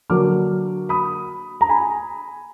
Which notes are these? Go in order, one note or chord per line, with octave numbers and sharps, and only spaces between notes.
D3 F#3 A#3 D4 D6 F6
B5 D#6
A#5
G#5 B5